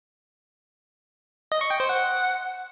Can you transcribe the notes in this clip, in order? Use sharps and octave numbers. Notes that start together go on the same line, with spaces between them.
D#5
C#6
G5
C5
F#5